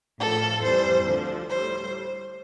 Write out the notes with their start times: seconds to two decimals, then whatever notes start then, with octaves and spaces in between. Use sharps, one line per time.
0.19 A2 F3 A4
0.62 F2 E3 G3 C5
1.05 D2 D3 F3
1.48 A2 G3 C5